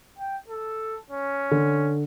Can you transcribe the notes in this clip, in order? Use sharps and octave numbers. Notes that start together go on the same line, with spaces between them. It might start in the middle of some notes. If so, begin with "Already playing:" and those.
G5
A4
C#4
D3